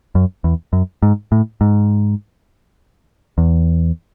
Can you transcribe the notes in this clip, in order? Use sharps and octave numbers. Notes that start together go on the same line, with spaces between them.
F#2
E2
F#2
G#2
A2
G#2
E2